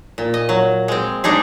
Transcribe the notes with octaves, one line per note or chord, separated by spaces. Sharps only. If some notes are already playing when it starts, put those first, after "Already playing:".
A#2
D#5
F#3
G#3 C4
G#3 D4 D#4 G#4